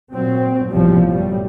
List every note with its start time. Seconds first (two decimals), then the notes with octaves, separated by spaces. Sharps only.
0.13 A#2 F#3 C4
0.71 A1 E2 A2 C3 F3 G3
1.08 F#2 A2 G3